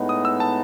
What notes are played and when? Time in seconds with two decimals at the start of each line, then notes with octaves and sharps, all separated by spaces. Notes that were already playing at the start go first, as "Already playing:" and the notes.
Already playing: A2 G#3 B3 D#4
0.09 D#6
0.25 E6
0.40 A5